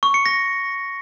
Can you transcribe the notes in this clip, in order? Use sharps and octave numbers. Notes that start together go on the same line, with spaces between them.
C#6
C#7
A#6